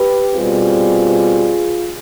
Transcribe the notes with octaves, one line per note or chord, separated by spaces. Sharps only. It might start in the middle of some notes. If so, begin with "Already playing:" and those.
Already playing: G4 B4
B2 G3 C4 F4 G#4